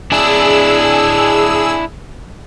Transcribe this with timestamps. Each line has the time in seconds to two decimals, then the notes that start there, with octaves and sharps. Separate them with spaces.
0.12 D4 E4 G#4 E6